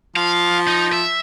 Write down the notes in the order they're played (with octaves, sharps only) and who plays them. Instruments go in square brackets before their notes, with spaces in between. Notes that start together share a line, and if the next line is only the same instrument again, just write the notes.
[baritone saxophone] F3 [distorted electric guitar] F5
[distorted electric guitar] D#4
E5